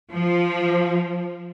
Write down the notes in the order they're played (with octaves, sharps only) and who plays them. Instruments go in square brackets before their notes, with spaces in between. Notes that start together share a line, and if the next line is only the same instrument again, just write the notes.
[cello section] F3